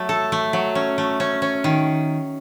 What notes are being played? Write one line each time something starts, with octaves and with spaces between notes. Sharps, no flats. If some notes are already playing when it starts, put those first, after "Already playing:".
Already playing: F#3 A3
A4
A3
F#3
C#4
A3
C#4
C#4
D#3